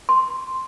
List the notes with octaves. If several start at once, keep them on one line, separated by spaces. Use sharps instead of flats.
C6